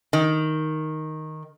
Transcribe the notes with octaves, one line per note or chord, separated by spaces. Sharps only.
D#3